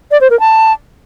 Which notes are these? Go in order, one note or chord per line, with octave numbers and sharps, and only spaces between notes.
D5
C5
A#4
A5